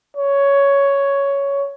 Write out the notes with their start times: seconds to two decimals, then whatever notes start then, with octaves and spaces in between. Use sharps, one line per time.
0.17 C#5